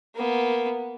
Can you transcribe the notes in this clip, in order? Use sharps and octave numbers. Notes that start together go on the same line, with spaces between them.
A#3 B3